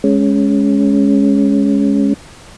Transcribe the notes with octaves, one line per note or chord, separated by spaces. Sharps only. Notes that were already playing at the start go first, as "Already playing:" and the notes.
G#3 C#4